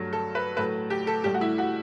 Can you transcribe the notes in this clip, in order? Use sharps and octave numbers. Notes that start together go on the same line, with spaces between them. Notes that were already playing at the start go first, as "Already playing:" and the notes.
Already playing: G2 F#3 A3
A4
B4
A2 F#3 A3 B4
G4
A4
A2 G3 G4
F#4
E4
F#4